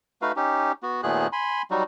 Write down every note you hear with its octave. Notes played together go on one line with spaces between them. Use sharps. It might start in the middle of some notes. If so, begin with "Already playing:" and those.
A3 D#4 F#4 B4 F5
C#4 D#4 G4
B3 F#4
D#2 A#2 A3 B3 G#4 F#6
G#5 B5 C6
F#3 G3 D#4 F#4